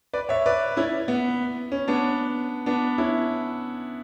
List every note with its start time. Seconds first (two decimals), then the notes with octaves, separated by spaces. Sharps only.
0.13 B4 D5
0.29 C#5 E5
0.46 B4 D5
0.77 C#4 E4
1.08 B3
1.72 C#4
1.88 B3 D4
2.66 B3 D4
2.98 C#4 E4